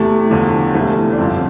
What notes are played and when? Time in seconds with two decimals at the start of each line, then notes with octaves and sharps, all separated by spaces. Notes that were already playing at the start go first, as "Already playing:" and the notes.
Already playing: E2 C3 E3 A3
0.30 E1 E2 D3 F3
0.74 E1 D2 C3 E3 A3
1.13 D4
1.18 G1 F2 D3 F3 C4